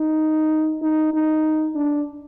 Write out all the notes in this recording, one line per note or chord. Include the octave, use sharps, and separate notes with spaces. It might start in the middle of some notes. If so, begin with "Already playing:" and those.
Already playing: D#4
D#4
D#4
D4